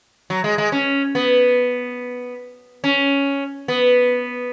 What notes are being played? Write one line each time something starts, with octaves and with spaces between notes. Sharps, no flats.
F#3
G#3
G#3
C#4
B3
C#4
B3